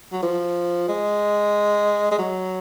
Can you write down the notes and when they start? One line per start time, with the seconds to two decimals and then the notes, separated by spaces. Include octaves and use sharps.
0.12 F#3
0.23 F3
0.88 G#3
2.11 G#3
2.19 F#3